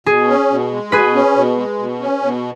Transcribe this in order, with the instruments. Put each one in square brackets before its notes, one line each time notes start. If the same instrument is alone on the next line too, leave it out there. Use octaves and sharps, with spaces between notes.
[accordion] B2 [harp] G#4
[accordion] C#4
B2
G#3
[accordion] B2 [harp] G#4 B4
[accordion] C#4
B2
G#3
B2
C#4
B2